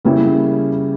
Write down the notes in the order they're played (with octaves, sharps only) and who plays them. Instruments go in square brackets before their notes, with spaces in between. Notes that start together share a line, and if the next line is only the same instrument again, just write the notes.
[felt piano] C#3 G3 A#3 C#4 E4